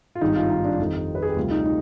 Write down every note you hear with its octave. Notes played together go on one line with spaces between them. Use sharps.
F4
G#1 G2 D#3 G#3 D#4
F4
D#4
D4
F2 D#3 G3 D#4
B4
G#4
G4
D2 C3 G3 F4
D#4
D#4